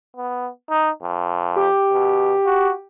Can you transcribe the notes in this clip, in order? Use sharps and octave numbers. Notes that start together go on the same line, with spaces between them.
B3
D#4
F2
G4
B2
F#4